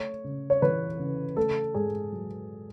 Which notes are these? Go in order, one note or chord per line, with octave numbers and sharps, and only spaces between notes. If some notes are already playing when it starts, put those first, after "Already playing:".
Already playing: A3 C#5
C#3
C#5
E3 B4
C#3
A3 A4
G#2 G#4
F#3